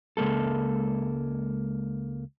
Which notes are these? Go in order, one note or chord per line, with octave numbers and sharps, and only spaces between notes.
C#2 G#3 A#3 A4